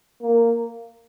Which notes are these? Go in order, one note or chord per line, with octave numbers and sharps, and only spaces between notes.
A#3